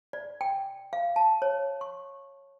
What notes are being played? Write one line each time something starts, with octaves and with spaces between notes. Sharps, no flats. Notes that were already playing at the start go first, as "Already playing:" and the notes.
D5
G5
F5
A5
C#5
C#6